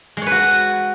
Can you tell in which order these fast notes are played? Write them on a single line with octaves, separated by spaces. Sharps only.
G#3 C#5 B4 F#4